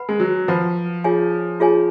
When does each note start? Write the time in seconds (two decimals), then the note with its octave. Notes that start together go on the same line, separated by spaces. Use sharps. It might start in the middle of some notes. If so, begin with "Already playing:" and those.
Already playing: B4 F#5 B5
0.09 G#3
0.20 F#3
0.48 F3 B4 F#5 B5
1.04 F4 G#4 C#5 G#5
1.60 F4 G#4 C#5 G#5